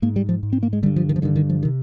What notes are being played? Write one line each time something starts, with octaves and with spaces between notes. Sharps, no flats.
G#2 A#3
G3
F3
G#2
C4
A#3
G#3
G2 D3 G3
F3
D#3
F3
G2 D3 D#3
D#3
F3
C3 D#3